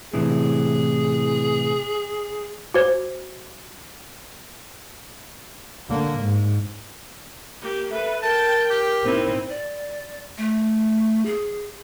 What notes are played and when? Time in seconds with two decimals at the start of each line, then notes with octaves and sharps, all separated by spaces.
0.13 A2 C3 E3 G#4
2.74 F#4 C5
5.89 D3 A#3
6.19 G#2
7.61 A#3 G4
7.90 A4 B4 E5
8.23 A#4 G5 A5
8.70 G4
9.05 C4 D#4 E4
9.49 D5
10.38 A3
11.26 G#4